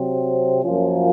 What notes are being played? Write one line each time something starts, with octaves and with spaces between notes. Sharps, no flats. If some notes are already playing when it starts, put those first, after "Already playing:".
Already playing: C3 F#3 C4
F#2 F3 A#3 C#4 F4